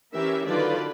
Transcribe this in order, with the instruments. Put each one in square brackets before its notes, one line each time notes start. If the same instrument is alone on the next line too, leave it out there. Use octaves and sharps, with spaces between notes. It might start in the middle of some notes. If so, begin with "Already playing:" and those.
[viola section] E3 C#4 G4 A#4 E5
D3 D#3 F#3 F4 B4 D5